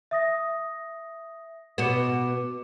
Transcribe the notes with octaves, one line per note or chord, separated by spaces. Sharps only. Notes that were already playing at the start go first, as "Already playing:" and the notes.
E5 D#6 A#6
B2 B3 D6 C#7 E7